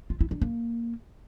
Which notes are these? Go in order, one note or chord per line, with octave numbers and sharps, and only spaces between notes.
F4
E4
D4
A#3